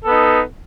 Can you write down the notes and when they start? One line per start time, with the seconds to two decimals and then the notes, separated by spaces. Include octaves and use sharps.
0.04 A4
0.07 B3
0.10 D#4